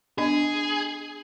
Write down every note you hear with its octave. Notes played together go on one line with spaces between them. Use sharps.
B3 D4 G#4 D#5